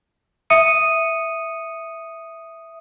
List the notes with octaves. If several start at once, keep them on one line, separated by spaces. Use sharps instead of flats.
E5 D#6 C#7 D#7